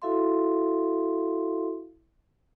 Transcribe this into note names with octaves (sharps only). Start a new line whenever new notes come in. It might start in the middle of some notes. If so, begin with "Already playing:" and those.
E4 F#4 A4 E5 F5 C6